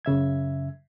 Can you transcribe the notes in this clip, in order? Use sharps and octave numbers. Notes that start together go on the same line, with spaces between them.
F#2 C#3 E5 G#6